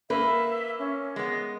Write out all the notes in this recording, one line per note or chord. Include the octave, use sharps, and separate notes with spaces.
A#3 B4 E5
C#4
G#3 B3 A#6